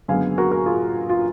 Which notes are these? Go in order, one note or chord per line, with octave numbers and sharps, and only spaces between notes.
F#1 F#2 D3 G#3 B3 F5 G#5
F#4 A#4
F#4 A#4
F4 G#4
F4